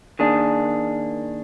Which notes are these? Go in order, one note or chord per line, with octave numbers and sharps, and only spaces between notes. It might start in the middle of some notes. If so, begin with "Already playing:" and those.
D#3 A#3 D4 G#4